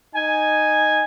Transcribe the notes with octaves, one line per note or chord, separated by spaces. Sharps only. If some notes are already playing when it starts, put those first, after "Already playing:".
D#4 G#5